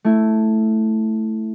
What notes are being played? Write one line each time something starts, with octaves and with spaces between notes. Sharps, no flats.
A3 E4